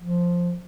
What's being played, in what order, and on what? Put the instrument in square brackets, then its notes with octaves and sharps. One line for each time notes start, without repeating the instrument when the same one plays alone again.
[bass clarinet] F3